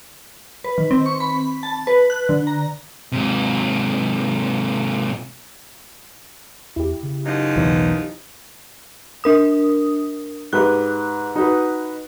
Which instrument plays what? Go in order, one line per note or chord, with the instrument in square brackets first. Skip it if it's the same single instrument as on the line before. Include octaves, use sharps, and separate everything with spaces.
[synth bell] B4
D#3
C4
C#6
B5
A5
B4
F#6
D3
A#5
[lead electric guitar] G#2 C3
[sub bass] E2 [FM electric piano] E4 G4
[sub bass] C#3
[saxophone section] F#2 F3 D#4
[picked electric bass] B1 E2 E3
[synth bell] D4 A#4 D#6
[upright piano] G#2 G4 B4 [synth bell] F#6
[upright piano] D#4 F#4 B4